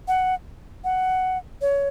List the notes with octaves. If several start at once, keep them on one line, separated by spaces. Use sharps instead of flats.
F#5
F#5
C#5